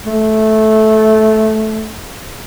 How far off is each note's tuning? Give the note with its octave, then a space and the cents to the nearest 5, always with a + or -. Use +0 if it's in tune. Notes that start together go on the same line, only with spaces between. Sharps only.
A3 -15